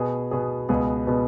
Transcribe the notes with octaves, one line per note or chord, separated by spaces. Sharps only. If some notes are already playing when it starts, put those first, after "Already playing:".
Already playing: B2 B3 G#4
B2 B3 G#4
C#2 B2 B3 G#4
B2 B3 G#4